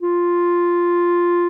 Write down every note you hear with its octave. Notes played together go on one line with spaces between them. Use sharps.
F4